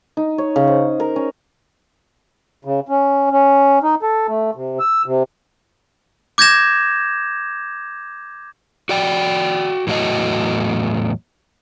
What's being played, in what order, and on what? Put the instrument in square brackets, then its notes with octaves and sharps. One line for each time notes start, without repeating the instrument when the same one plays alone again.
[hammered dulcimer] D#4
C#5
C#3
C5
A#4
C#4
[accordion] C#3
C#4
C#4
D#4
A4
A3
C3
E6
C3
[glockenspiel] D6 G6 G#6 A#6 E7
[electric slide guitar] F#4 D5 G5
E2 A2 F#3 F#4 D#5